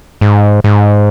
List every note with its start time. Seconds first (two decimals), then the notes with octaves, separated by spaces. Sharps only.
0.21 G#2
0.64 G#2